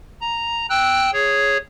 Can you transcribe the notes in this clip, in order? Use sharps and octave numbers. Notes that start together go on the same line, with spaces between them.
A#5
G5 E6 F#6
G#4 C#5